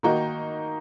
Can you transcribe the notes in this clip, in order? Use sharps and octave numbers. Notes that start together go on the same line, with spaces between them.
D#3 A#3 D#4 F#4